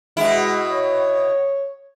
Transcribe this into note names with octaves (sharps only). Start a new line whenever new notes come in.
B2 G#3 E4
C#5